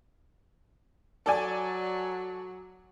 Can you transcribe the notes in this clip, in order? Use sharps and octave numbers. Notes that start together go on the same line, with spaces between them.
F#3 A4 D5 G#5